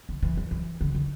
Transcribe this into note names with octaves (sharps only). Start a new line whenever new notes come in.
D3
E3
F3
E3
D3
D#3